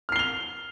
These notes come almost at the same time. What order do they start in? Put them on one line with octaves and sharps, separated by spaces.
F6 C7 G7 F7